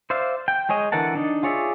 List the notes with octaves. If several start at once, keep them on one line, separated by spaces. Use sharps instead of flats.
C5 D5 E5 F5
G5
G#3 G#4 C#5 D#5
D3 E3 A#4 F#5 A5
D4 D#4
F4 G#4 C#5 D5 E5